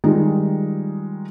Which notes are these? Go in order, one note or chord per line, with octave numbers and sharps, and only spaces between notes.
D#3 G3 G#3 D#4 F4